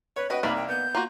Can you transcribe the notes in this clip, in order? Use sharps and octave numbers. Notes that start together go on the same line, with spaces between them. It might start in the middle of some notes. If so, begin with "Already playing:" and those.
B4 C#5
F#4 B4 D#5 G5
C2 A#3 D#4 D5 B5
G5
B3 G6
A#3 F4 F#4